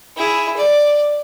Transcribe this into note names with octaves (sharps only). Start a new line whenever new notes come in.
E4 G#4
D5